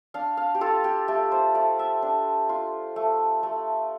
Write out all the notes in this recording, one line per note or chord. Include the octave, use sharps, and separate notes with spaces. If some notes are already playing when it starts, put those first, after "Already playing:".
D4 F5
F5
G4
F4 A4
G4
A3 G4
C5
A3 D5
E5
D4
F4
A3
A3